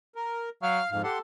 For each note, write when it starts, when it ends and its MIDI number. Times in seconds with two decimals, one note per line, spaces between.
0.15 0.49 70
0.62 0.80 54
0.62 0.90 77
0.62 0.90 89
0.91 1.03 41
0.91 1.03 44
0.91 1.02 77
1.04 1.19 67
1.04 1.21 69
1.04 1.19 78
1.04 1.19 84